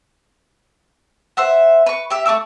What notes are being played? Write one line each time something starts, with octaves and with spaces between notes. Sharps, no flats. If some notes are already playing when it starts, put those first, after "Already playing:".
C5 E5 F#5
B4 C#6
G4 E5
A3 C#6 D6 E6